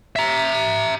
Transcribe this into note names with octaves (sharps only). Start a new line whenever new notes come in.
E5 A#5